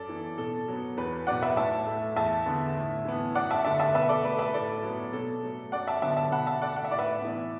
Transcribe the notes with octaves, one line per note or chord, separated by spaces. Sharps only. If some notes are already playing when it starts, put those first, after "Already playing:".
Already playing: F#2 A4 D5
E3 B3
B2 A4
F#3 B3
E2 B4
B2 F#3 D5 F#5
B4 E5
A2 E5 A5
A3
E2 E5 A5
D3 B3
A2
E3 B3
F#2 D5 F#5
E5 A5
D3 A3 E5 A5
E5 A5
B2 B4 E5
A4 D5
A3 B4
B4 E5
A2 A4 D5
F#3 B3
B2 A4
F#3 A3
F#2 D5 F#5
E5 A5
D3 F#3 B3 E5 A5
E5 A5
B2 F#5 B5
E5 A5
A3 D5 F#5
F#5
E5
A2 D5
B4 E5
E3 B3